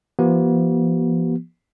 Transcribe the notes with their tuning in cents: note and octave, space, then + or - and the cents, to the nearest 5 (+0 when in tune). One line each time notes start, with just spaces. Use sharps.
F3 -40 B3 -45 G4 -45